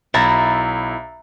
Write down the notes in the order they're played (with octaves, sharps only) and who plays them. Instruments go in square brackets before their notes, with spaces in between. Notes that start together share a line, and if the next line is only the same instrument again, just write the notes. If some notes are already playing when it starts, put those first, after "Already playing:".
[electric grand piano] B1 A6 [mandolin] E4 [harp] A#5